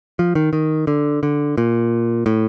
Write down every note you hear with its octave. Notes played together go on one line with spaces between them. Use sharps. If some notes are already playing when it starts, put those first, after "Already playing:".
F3
D#3
D#3
D3
D3
A#2
A2